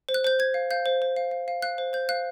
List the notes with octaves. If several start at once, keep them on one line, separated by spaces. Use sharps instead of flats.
C5
F#6
C5 G6
C5 G#6
F5
F5 G6
C5
C5
F5
F5
F5
F5 F#6
C5
C5 G6
F5 F#6